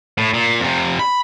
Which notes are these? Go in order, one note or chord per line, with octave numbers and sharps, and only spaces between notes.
A2
A#2
F2 C3
B5